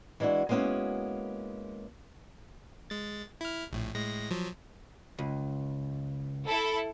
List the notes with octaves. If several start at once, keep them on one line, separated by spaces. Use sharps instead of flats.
E3 G#3 D4 E4 F#4
G#3 A#3 B3 C#4 E4 F#4
G#3 A6
E4 F6
A#1 A2
A2 G#3 A#6
F3 F#3
C#2
E4 A4